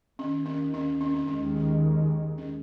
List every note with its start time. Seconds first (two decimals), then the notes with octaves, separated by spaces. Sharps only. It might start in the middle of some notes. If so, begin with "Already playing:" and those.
0.19 D#2 D#3 A#3 C#4
0.46 C#4
0.74 C#4
1.01 C#4
1.14 C#4
1.28 D#2 D#3 G#3 C#4
1.56 C#4
2.38 C#4